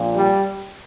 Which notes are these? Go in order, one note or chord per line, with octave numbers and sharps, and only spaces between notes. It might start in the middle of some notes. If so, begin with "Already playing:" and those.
Already playing: A#1 A#2 F3
G3